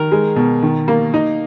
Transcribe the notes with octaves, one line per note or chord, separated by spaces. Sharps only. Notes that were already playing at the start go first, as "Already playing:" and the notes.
Already playing: D#3 A#4
G#3
B2
D#3
A#3
D#4